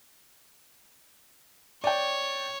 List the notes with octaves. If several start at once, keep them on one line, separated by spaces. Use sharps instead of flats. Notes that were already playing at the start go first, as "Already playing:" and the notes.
C#5 D5 G5